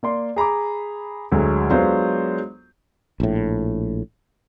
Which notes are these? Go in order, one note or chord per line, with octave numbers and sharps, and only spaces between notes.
A#3 D5 C6
G#4 A#5 B5 D6
D2 F#3 G#3
F#3 G#3 B3 D4 F4 C5
A#1 A2